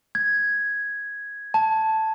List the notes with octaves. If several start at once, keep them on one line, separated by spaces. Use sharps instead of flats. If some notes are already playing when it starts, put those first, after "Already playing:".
G#6
A5